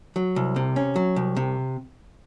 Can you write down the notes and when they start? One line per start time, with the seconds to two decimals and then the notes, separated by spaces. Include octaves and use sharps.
0.16 F#3
0.36 C2
0.56 C3
0.76 C#4
0.96 F#3
1.16 C2
1.36 C3